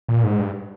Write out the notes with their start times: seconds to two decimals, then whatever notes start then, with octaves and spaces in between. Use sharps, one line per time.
0.09 A#2
0.24 G#2
0.40 G2